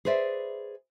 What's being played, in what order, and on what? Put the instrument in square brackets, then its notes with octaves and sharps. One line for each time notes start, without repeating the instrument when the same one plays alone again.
[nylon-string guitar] G#4 B4 C5 D5 E5